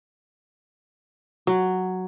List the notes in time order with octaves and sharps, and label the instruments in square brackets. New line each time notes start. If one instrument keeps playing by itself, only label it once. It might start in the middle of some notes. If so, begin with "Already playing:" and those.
[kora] F#3